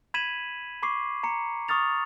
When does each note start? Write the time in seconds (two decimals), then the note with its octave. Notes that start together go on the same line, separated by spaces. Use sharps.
0.14 B5 G#6 B6 D#7 E7 F#7
0.83 B5 C#6 D6 C7
1.23 A#5 C#7
1.68 C#6 D#6 F6 A6 F7